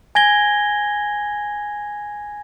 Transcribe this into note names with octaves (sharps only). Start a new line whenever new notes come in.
G#5 G#6 A#6 G7